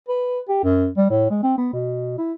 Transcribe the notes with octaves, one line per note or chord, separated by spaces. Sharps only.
B4
G4
F#2
G3
A2
G#3
C4
B3
B2
E4